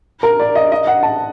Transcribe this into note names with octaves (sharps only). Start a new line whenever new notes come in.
A#4
D5
D#5
D#5
F#5
A5